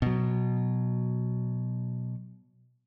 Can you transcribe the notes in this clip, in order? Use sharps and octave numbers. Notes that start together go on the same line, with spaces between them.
B2 F#3